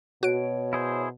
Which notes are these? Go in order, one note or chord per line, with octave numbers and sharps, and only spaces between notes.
B2 F#4 C#5 D7
E4 G#4 C5